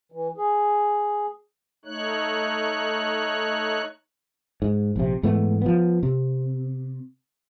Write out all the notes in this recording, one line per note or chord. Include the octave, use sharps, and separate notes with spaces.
E3
G#4
A3 D#4 C#5 F#6
G#2
A#1 C3
G#2 E3 A3 B3
F3 B3
C3